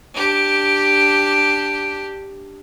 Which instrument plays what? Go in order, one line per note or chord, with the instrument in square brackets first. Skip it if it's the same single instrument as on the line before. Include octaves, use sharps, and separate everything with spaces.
[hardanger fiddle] D4 G4